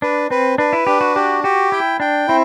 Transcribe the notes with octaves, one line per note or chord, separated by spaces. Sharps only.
D4 B4
C4 B4
D4 B4
E4
D4 G4
F#4
F#4 G4
F#4 G4
E4 G5
D4 G5
C4 E4